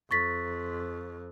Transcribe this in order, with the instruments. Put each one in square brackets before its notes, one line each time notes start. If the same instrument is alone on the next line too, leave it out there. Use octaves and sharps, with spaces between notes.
[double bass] F2 [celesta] C#6 A6 B6